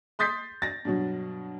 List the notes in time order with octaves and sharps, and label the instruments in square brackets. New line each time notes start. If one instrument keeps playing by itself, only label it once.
[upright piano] C6 D#6 G6 A6 B6 C7
A6 A#6
G2 B2 F#3